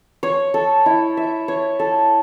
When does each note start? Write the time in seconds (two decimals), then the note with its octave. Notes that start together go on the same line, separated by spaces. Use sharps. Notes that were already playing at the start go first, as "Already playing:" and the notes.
0.23 C#5
0.54 A4
0.86 E4
1.17 E5
1.48 C#5
1.79 A4